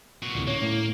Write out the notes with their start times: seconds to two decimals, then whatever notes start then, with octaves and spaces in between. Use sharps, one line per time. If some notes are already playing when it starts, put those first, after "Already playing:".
0.22 A#2 F#4
0.35 D2 A2 C3
0.47 A#3 C#4 C#5
0.62 A2